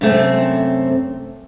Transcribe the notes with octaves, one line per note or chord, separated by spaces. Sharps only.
F#2 C3 A3 C4